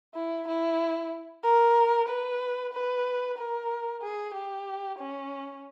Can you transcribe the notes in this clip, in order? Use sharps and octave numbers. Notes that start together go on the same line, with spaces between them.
E4
E4
A#4
B4
B4
A#4
G#4
G4
C#4